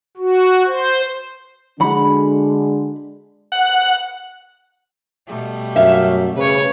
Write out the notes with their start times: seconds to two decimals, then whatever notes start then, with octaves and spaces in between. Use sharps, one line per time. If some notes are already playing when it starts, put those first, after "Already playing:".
0.17 F#4
0.66 C5
1.80 D3 G#3 D4 F#4 B5
3.52 F#5
5.27 B2 G3 A3
5.76 F#2 E5 F5
6.36 C#3 B4 C#5